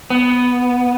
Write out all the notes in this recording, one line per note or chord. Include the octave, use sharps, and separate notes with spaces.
B3